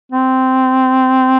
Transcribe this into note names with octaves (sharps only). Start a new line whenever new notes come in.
C4